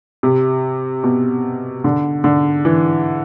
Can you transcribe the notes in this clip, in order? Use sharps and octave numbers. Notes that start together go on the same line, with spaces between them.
C3
B2
D3
D3
E3